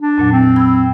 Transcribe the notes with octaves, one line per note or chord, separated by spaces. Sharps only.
D4
F2 A#2 F#3
C4
B5 E6 G#6